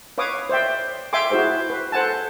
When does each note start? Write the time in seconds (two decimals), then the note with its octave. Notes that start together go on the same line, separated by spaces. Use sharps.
0.18 B4 C#5 F5 D6 D#6
0.49 C5 D5 E5 G5
1.13 E5 F5 G5 G#5 C6 D6
1.31 E4 F#4 G#4 C5 E5
1.70 B4
1.92 A4 C5 F#5 G#5 A5